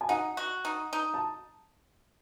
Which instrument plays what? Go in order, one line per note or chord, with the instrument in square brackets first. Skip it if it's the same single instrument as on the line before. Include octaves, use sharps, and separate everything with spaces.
[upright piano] G#5
[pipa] D#4 [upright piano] D#5 F#5
[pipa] F#4
D#4
D#4
[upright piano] A5